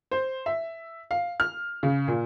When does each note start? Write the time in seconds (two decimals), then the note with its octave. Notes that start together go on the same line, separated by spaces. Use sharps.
0.11 C5
0.46 E5
1.11 F5
1.40 F6
1.83 C#3
2.08 A#2